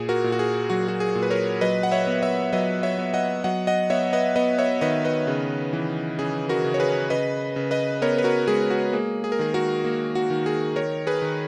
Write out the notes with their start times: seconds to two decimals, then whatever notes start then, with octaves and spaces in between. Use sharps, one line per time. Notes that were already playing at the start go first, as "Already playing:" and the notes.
Already playing: A#2 G#4
0.09 F#4 A#4
0.24 A#2
0.32 F#4
0.39 G#4
0.70 F#3 F#4
0.88 F#4
1.00 G#4
1.15 A#2
1.23 B4
1.30 A#4 C#5
1.61 F#3 B4 D#5
1.83 F#5
1.91 C#5 E5
2.07 B3
2.22 C#5 E5
2.53 F#3 B4 D#5
2.83 C#5 E5
2.99 B3
3.14 D#5 F#5
3.44 F#3 D#5 F#5
3.67 D#5 F#5
3.90 B3 C#5 E5
4.13 B4 D#5
4.36 B3 B4 D#5
4.58 C#5 E5
4.81 D#3 B4 D#5
5.04 B4 D#5
5.27 C#3
5.73 E3
6.19 C#3 G#4
6.49 F#4 A#4
6.64 C#3
6.74 C#5
6.80 G#4 B4
7.10 C#3 B4 D#5
7.56 C#3
7.71 B4 D#5
8.02 B3 A#4 C#5
8.18 B4
8.24 F#4 A#4
8.47 G#3 G#4
8.70 F#4
8.93 A#3 G#4
9.24 G#4
9.32 A#4
9.39 D#3 G#4
9.54 F#4 A#4
9.85 A#3
10.15 F#4
10.30 D#3
10.46 G#4
10.76 D#3 A#4 C#5
11.07 G#4 B4
11.22 D#3